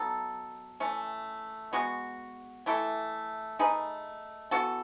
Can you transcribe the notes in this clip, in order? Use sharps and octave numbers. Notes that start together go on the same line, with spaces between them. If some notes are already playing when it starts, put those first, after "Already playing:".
Already playing: F#3 B3 D#4 A4
E3 A3 C#4
G#3 B3 F#4
E3 A3 E4 A4
A3 D#4 G#4 B4
E3 B3 F#4 A4